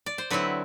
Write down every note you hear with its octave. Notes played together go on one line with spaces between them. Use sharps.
D5
C5
D3 F#3 C4 E4 B4